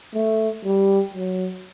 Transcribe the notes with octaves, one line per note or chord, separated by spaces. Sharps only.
A3
G3
F#3